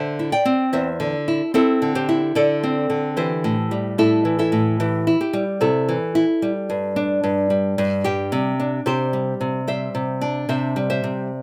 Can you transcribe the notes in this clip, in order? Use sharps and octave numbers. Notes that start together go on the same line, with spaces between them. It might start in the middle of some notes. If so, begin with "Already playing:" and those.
Already playing: D3 C5 E5
E4
D5 G5
C4
E2 C5 E5
D3
E4
C4 E4 A4
D3
G4 C5
E4
D3 A4 D5
C4
D3
E3 G4 C5
A2
G3
A2 E4 A4
E3
E4 A4
A2
E3 G4
E4
G4
G3
C3 E4 A4
E3
E4
G3
G2
D4
G2
G3
G2
G3 G4
C3
D4
C3 G4 C5
G3
C3
G3 C5 E5
C3
D4
C3 C5 E5
G3
C5 E5
C3